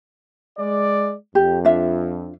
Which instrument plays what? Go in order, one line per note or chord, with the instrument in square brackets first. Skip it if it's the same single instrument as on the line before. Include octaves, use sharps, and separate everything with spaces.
[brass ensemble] G#3 D5
[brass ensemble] F2 [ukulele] G4
[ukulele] D4 F4 E5